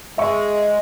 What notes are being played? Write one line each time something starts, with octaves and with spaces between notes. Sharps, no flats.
G#3 E5 C#6